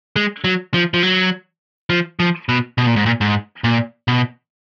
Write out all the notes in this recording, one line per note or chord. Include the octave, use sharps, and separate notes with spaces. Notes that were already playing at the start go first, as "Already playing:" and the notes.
G#3
F#3
F3
F3
F#3
F3
F3
B2
B2
A#2
G#2
A#2
G#2
A#2
B2